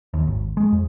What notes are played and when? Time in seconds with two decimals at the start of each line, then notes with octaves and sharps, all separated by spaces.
0.14 D#2
0.27 G#1
0.57 G#3
0.73 F2